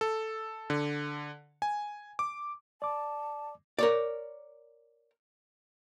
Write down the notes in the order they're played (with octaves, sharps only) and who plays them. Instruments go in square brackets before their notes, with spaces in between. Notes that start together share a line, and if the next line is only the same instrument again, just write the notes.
[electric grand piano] A4
D3
G#5
D6
[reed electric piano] D5 D6 [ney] A5
[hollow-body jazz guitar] A#4 C#5 D5